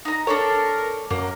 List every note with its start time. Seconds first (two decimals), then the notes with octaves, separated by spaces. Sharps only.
0.05 D#4 A#5
0.27 D4 A4 A#4 C#5
1.10 F#2 A#3